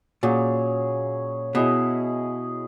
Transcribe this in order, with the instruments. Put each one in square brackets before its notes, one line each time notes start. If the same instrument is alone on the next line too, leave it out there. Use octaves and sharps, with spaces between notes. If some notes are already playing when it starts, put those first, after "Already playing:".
[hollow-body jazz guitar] A#2 [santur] F#3 C#4 G#4
[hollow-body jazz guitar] B2 [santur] E4 G#4 D#5